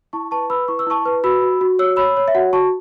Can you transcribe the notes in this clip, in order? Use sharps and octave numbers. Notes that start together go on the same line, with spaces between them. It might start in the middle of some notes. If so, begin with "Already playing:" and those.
E4 A5 C#6
B4 A5 C#6
B4 B5 E6
E4 C#6
E6
E4 A5 C#6
B4
F#4 B5 E6
F#4
F#4
C#5 E6
C#5 B5 E6
C#5
E5
F#4 F#5
F#4 A5 C#6